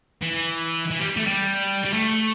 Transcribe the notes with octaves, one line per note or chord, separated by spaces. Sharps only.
E3
E3
G3
A3
G3
G3
A3